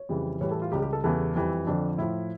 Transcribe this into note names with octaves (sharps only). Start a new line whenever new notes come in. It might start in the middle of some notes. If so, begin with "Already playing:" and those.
Already playing: C#5
F2 C#3 E3 G3
A2 E3 G3 C#5
A4
F4
C#2 C#3 G3 G4
G4
A4
E2 C#3 E3 G3 A4
F2 E3 G3
F2 D3 F3 D4
A2 F3 E4